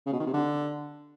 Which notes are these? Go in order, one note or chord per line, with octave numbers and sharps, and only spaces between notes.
C#3
B2
D#3
C3
D3